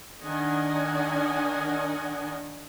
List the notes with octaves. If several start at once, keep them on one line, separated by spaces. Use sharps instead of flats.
D#3 D4 A#4 D#5 F#5 G#5